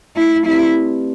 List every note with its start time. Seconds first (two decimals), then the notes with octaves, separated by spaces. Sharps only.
0.15 A3 E4
0.45 C4 E4 G4 B4 D5